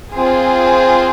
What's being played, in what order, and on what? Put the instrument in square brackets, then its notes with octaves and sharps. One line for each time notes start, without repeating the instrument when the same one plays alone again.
[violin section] C4 F4 G#4